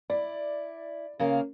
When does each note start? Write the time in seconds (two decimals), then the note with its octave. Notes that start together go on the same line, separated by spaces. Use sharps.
0.10 E4 D5
1.19 C#3 A#3 A#4